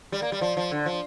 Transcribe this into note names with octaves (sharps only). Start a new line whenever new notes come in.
G3
A#3
G3
F3
F3
D3
F3